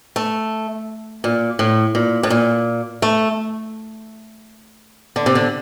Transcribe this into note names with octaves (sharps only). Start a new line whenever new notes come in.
A3
A#2
A2
A#2
A2
A#2
A3
D3
C3
D3